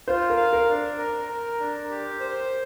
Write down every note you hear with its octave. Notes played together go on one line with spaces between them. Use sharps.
F4 C5
A#4
F5
A#4
D4
A#4
A#4
D4
G4
C5